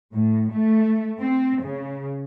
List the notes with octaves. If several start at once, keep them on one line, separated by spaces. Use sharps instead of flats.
A2
A3
C4
C#3